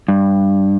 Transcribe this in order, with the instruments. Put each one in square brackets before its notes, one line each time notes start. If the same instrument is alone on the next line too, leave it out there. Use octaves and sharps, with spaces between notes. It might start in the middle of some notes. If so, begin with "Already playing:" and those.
[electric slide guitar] G2